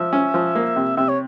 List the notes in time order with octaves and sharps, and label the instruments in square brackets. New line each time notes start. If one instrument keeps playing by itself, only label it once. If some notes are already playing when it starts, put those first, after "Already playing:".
Already playing: [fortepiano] F3 [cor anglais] E5
[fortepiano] C#4
F3
A#3
C3
[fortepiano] C3 [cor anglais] E5
[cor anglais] C#5